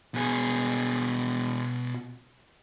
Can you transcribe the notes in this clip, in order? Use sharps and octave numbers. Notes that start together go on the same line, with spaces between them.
B2 G#4